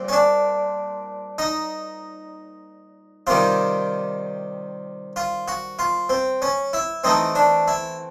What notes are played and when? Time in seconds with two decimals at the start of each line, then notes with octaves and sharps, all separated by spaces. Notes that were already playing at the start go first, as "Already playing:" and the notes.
Already playing: A#2 G3 C4
0.08 C#4
0.13 D4
1.38 D#4
3.27 C3 D#3 G3 F4
5.16 F4
5.48 F#4
5.79 F4
6.09 C4
6.42 C#4
6.73 E4
7.04 E3 A3 C4 D#4
7.35 D4
7.68 E4